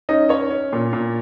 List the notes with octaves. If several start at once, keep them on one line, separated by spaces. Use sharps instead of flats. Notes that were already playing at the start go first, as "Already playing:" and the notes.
C#4 D#4 D#5
C#4 C#5
C#4
A#2
A#2